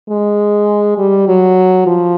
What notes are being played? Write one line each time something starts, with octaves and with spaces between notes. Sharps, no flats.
G#3
G3
F#3
F3